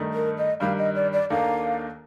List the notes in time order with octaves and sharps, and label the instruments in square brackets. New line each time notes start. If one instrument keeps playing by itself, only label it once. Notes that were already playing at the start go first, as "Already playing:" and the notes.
Already playing: [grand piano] G2 D#3 A3 D#4 A4
[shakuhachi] A#4
D#5
[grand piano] G2 D#3 G3 [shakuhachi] F5
[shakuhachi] D#5
D5
D5
[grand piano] D#2 D#3 A#3 D4 A4 [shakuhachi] F5